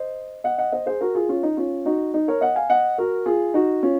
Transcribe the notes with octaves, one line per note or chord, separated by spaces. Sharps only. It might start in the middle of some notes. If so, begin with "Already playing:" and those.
Already playing: C5 D#5
D#5 F#5
D#5 F#5
C5 D#5
G#4 C5
F#4 A#4
F4 G#4
C#4 F4
D#4
C#4 F4
D#4 F#4
D#4
A#4 C#5
D#5 F#5
F5 G#5
D#5 F#5
F#4 A#4
F4 G#4
D#4 F#4
C#4 F4